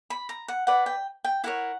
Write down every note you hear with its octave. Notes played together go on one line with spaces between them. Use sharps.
B5
A#5
F#5
E4 B4 D5 F#5
G5
G5
E4 A#4 C#5 F#5